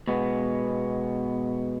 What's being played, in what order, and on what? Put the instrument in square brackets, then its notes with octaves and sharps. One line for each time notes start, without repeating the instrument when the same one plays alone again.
[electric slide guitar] B2 G#3 B3